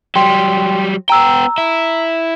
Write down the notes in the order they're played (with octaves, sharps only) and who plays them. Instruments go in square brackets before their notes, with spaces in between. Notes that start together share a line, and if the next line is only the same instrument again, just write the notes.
[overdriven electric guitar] F#3 G3 [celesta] G5 C6
[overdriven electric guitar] B3 G5 [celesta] A#5 E6
[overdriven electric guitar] E4